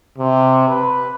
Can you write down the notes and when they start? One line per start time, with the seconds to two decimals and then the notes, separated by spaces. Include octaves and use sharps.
0.18 C3
0.69 B4